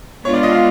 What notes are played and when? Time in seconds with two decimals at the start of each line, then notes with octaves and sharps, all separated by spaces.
0.25 G#3 B3 D4 F4 C#5
0.34 D5
0.43 D#5
0.52 F5